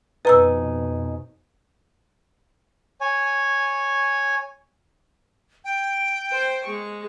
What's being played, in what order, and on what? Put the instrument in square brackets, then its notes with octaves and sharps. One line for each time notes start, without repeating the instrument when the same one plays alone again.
[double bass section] F2 B2 [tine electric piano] D#4 G#5 D#6 [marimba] B4 A#5 E6
[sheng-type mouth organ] C#5 G#5
[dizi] G5
[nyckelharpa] C5
G#3 C#6